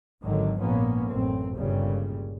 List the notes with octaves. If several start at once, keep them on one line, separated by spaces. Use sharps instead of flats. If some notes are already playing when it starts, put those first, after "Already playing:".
G#1 D3 D#3 F#3
A#1 G#2 F3 A#3 B3 C#4
A1 F#2 C4
G1 C#2 A#2 C#3 G3